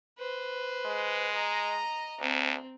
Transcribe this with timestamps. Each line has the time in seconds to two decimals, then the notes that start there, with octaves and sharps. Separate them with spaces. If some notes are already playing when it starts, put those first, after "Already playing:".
0.18 B4 C5
0.86 G#3
1.32 D#5 A#5
2.21 D2 C4